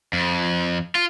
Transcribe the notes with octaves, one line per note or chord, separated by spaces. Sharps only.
F2
F4